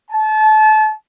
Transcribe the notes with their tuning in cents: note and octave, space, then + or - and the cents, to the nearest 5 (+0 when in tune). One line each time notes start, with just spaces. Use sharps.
A5 -30